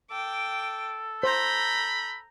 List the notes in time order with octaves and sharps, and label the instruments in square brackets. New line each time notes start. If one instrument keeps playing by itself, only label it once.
[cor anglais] A4 [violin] G5 D6
[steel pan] C5 [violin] A#5 G6 [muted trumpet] B5